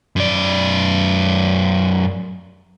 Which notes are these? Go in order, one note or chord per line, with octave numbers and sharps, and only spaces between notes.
F#2 D5